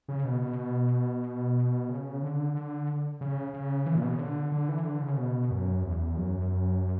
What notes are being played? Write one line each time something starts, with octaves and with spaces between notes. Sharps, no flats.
C#3
B2
B2
C#3
D3
D3
C#3
C#3
E3
A#2
B2
C#3
D3
D3
E3
D3
C#3
B2
F#2
E2
F#2